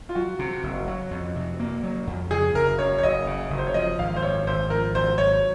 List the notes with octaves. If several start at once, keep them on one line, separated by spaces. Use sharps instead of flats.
F4
F#3 F#4
C3
F#1
F#3
F2
C3
A#3
F#3
F2
C#3 G#4
F#1 A#4
F#2 C#5
C#5
F#1 D#5
C#3
F#1
C5
C#5
F3 D#5
G#1 F5
C5
F#2 C#5
G#1 C5
F3 A#4
G#1 C5
F#3 C#5